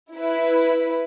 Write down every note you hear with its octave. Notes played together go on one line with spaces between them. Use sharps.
E4 B4